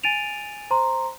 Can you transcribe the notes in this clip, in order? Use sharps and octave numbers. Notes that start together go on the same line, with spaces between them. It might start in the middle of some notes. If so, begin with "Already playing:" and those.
G#5 A6 D7 D#7 F7
C5 A#5 C6